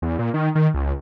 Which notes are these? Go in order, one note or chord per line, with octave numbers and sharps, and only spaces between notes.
E2
A#2
D#3
D#3
C#2